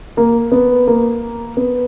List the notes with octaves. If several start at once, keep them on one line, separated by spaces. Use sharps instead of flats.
A#3
B3
A#3
B3